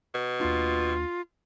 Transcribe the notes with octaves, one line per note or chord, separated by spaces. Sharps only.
B2
D#2 A#3 D4 F4